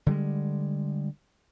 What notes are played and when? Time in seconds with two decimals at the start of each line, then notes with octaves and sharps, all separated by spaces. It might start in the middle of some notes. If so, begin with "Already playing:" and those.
0.06 D3 G3 G#3